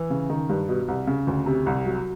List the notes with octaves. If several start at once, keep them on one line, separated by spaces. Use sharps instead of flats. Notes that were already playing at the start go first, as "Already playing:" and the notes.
Already playing: E3
C#3
D#3
G2
B2
C2
C#3
D2
C3
C2
F#3